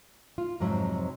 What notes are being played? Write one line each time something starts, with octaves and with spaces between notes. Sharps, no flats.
F4
F2 G#2 C3 F#3